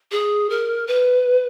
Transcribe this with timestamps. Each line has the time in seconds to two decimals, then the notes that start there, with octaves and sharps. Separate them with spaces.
0.12 G#4
0.50 A#4
0.87 B4